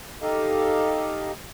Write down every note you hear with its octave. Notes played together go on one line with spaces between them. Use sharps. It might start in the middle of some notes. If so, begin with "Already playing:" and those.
D#4 G4 A4 D#5 F5